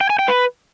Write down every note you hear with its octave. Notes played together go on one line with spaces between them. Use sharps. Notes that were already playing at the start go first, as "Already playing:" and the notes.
G5
G#5
G5
B4